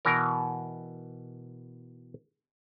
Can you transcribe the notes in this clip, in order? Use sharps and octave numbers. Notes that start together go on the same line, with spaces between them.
B2 E3 A#4